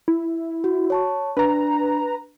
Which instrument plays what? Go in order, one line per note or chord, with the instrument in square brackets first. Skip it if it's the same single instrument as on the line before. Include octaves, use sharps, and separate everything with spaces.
[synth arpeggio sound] E4
[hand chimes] F#4
C#5 A5 C#6
[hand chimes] D4 [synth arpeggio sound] B4 A#5